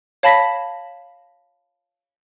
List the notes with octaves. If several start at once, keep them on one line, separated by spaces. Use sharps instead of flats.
C#5 F5 A5 B5 A#6 B6